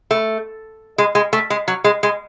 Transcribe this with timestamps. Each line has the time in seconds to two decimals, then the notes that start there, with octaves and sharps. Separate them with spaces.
0.11 A3
0.98 G#3
1.15 G#3
1.33 A3
1.50 G#3
1.68 F#3
1.84 G#3
2.03 G#3